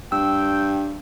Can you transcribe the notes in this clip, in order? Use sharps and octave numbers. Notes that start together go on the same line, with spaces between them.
G2 G5 E6